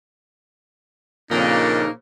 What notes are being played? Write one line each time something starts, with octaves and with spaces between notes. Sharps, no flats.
F2 A#2 C#3 A#3 D4 D#4